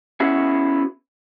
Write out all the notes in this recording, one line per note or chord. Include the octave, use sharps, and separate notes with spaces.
B3 C#4 E4 F#4 G#4